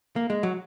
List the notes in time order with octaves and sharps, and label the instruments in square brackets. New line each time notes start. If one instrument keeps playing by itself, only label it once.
[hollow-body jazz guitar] A#3
G#3
F#3